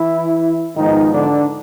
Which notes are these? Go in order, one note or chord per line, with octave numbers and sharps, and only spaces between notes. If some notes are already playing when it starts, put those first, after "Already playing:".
Already playing: E3 E4
G#2 D#3 F3 G#3 B3 D#4
D3 D4